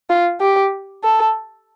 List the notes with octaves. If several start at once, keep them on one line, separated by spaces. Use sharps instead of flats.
F4
G4
A4